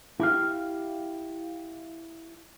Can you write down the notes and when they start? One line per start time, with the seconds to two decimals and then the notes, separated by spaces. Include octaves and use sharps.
0.20 E4 G4 F5